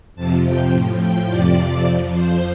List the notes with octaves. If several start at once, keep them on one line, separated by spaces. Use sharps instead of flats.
F2 C3 F3 A5
G5
A2 F3
G5
F2 C3 F3 D5
F2 F3
C5